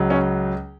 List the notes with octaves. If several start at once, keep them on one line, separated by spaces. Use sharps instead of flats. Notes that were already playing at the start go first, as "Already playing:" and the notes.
Already playing: C#2 C#3 F#3
C#4